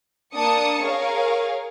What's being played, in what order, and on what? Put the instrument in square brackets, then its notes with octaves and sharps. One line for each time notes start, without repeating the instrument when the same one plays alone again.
[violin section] A#3 D4 A5 D#6 C#7
G#4 A#4 C#5 F5